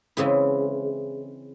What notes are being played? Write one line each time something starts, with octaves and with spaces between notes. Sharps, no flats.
C#3 E3 G#3 C4 E4